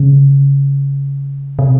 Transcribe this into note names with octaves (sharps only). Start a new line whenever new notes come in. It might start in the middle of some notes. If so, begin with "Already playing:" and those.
Already playing: C#3
C3